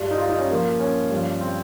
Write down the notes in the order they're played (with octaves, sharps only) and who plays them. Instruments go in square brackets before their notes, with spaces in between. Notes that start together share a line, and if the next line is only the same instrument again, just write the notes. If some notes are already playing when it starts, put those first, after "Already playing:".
Already playing: [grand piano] G2 G3 F4
D#4
F4
D#4
C#4
A#2 F3 A#3
C#4
G2 F3
C4